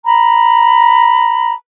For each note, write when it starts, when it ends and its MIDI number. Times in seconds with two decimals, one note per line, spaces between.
0.06 1.53 82
0.06 1.53 83